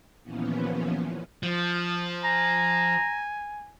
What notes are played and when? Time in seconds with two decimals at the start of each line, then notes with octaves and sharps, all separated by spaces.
0.23 D#2 A#2 E3 F3 B3 C#4
1.43 F3
2.24 G#5 A#5